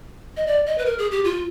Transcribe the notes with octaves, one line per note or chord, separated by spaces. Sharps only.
D#5
D5
D#5
B4
A#4
G#4
G4
F4